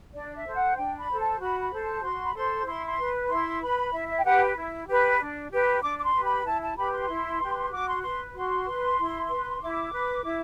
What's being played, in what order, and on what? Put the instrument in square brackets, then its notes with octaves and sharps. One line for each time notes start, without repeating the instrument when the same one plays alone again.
[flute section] D4 D5
E5
A4 C5
F#5
D4 G5
B5
A4 C5
A5
F#4 B5
B5
A4 C5
A5
F#4 C6
B5
A4 C5 C6
E4 C6
C6
B4
E4 C6
B4 B5
E4 E5
E5
G5
G4 B4 F#5
E4
G4 B4
D4
G4 B4
D4 D6
D6
C6
G4 B4
B5
E4 A5
A5
G4 B4 B5
C6
E4
G4 B4
F#4 D6
C6
B4 C6
F#4 C6
B4
E4
B4
E4 D6
B4
E4